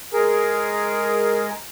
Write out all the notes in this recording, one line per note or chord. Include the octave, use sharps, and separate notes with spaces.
G#3 G#4 A#4